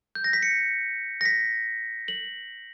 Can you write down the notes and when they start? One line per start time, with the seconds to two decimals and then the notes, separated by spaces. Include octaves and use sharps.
0.15 G6
0.24 A#6
0.33 B6
0.43 C#7
1.21 A#6
1.25 B6
2.08 F#7